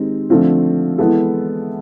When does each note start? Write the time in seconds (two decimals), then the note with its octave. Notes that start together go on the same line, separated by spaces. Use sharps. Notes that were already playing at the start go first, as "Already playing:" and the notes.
Already playing: D#3 G#3 C4 D#4 G4
0.30 D3 F3 A3 C4 F4
0.98 E3 G#3 B3 E4 A4